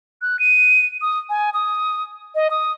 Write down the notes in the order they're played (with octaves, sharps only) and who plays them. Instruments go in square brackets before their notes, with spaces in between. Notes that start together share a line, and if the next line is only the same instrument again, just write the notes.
[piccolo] F#6
D#7
D#6
G#5
D#6
D#5
D#6